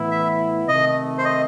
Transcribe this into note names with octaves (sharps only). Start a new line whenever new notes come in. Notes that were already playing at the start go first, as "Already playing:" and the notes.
Already playing: A2 E3 B3 E4
E5
C3 D#3 A3 D#5
C5
D#5